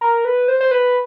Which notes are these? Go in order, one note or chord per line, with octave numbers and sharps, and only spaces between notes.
A#4
B4
C5
C5
B4